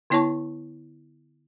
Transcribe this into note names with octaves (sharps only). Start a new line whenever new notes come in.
D3 B3 E4 C#5 A5 C#6